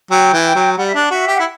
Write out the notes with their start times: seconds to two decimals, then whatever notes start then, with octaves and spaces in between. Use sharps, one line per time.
0.10 F#3 G5
0.33 E3
0.55 F#3
0.77 G3 F#5
0.87 E5
0.94 D4 F#5
1.10 F#4 E5
1.27 G4
1.34 F#5
1.39 E4